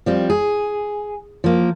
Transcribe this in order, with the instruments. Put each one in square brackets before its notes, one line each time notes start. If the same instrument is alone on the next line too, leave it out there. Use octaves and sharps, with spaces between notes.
[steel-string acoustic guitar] F3 G3 C4
G#4
F3 A#3